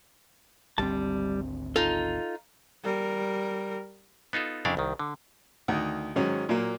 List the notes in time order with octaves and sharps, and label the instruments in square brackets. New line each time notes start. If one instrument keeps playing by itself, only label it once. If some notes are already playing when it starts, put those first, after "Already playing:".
[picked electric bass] G#1 D2 C4 [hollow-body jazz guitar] G3 A5
[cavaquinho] D#4 F4 [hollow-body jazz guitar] A4
[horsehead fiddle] G3 A#4
[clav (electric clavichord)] B3 D#4 F4 A4
F2 C#3 D4 E4 D5 F5
C2 D#3
D3
[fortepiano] D2 D#3
G#2 D#3 F#3 C#4 C#5
A#2 F#3 A#3